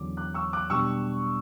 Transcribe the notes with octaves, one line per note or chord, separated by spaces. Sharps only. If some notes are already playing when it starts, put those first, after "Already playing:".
Already playing: E2 D3 F#3 C#4 D6
D6 F#6
C#6 E6
D6 F#6
B2 G3 D4 C#6 E6